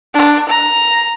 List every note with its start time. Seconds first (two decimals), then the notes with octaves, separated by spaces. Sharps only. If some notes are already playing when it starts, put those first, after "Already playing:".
0.14 D4
0.49 A#5